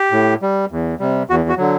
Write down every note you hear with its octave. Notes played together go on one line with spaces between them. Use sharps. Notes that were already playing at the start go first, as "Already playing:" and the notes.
Already playing: G4
A2
G3
E2
C3 G3
E2 F#4
F#4
D3 F#3